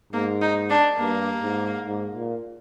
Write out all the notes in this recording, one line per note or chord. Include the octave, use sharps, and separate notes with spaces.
G#2 A#3
D#4
D4
G2 A#3
G#2
G#2
A#2